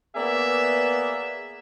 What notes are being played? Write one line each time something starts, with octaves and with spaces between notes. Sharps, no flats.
A#3 B3 G#4 D5 E5